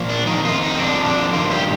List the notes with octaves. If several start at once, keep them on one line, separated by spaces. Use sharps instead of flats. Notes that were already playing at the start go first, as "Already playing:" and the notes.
Already playing: A#2 F3
D4
F2 D#3 D#4
F4
D#4
C4
F2 D3 F3 D4
D4
G2 D#3 F4
G4